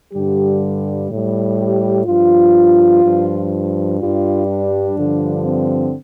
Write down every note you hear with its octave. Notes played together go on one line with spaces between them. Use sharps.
G2 D3 G3 G4
A2 G3
G4
G2 F3 F4
G2 F3
G2 G3 F4
D4
G2 D3 F3
C4